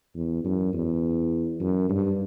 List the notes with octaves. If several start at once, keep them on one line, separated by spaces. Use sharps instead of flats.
E2
F#2
E2
F#2
G2